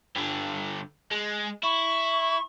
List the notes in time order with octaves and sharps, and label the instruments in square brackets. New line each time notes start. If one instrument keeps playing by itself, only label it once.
[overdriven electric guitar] G2 D3
G#3
[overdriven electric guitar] E4 [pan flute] C#6